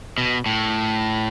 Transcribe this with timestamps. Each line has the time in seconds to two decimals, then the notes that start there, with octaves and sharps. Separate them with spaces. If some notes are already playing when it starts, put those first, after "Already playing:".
0.18 B2
0.46 A2